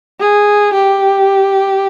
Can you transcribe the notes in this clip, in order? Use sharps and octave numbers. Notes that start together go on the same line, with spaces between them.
G#4
G4